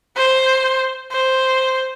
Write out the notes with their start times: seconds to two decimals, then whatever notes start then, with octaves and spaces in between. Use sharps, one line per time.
0.17 C5
1.12 C5